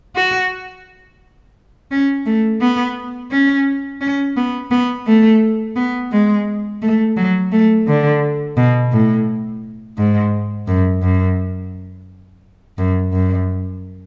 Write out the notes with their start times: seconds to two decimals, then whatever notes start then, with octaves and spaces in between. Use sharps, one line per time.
0.16 F#4
1.91 C#4
2.26 A3
2.61 B3
3.31 C#4
4.01 C#4
4.37 B3
4.71 B3
5.07 A3
5.76 B3
6.12 G#3
6.82 A3
7.17 F#3
7.52 A3
7.88 D3
8.57 B2
8.92 A2
9.98 G#2
10.67 F#2
11.02 F#2
12.78 F#2
13.13 F#2